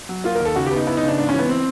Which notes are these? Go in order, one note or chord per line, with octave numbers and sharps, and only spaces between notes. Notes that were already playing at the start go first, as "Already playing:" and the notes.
F#3
A#3 F4
A#4
D#2
A4
C#3 F#4
G4
B3
D#4
B3 E4
D#4
C#3 D4
G#2 D4
C#4
E3 B3
C4